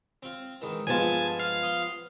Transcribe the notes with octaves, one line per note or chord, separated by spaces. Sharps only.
C4 F4
G#2 D#3 E3
G2 F3 G#3 A3 B3 F4 G#5 A5
F5
C6 D#6